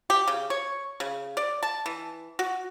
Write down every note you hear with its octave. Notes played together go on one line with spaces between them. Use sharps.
G4
C#3
C#5
C#3
D5
A5
E3
F#4